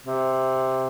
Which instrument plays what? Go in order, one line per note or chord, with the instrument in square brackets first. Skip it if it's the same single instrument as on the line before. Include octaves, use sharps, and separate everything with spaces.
[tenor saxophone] C3